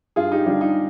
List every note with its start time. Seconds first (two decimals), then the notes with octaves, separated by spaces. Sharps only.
0.16 G2 F4 G#4
0.32 D#4 G4
0.46 D3 G3 D4 F4
0.61 D#4